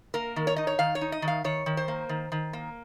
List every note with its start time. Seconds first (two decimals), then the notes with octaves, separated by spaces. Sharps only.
0.14 A#3 A#4
0.36 D#3
0.47 C#5
0.56 D#4 D#5
0.67 C#5
0.79 D#3 F5
0.95 C#5
1.01 D#4
1.12 D#5
1.22 D#3
1.28 F5
1.44 D#3 C#5
1.66 D#3
1.77 C5
1.88 A#3
2.09 D#3
2.32 D#3
2.53 A#3